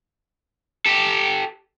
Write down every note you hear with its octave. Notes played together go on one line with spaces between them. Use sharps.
G4 A4